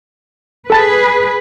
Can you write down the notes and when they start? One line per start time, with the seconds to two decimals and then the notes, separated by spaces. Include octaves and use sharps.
0.70 G#4 A4 B4 A5 A6